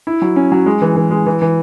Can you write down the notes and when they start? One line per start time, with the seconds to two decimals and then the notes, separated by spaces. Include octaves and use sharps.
0.07 E4
0.22 F#3
0.36 C#4
0.52 F#3
0.66 G#3
0.82 E3
0.96 E3
1.11 G#3
1.26 E3
1.42 E3